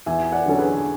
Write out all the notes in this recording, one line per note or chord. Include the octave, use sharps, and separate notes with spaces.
E2 E5 G#5
D5 F#5
D3 F#3 C#4 A4
G#4 B4